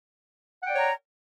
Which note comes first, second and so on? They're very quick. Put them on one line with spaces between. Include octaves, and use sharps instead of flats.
F#5 G5 D5 C#5 A#5